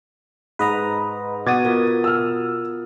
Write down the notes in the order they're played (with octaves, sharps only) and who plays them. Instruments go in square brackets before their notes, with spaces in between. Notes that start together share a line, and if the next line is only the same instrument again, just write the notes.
[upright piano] G#2 [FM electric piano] B4 D#5 A#5
[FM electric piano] B2 F#4 D#6 [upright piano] D6 G#6 A6
[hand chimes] B3 F4 A#4
[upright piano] E6 F6